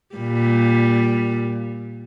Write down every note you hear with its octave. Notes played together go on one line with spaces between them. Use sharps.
A#2 G3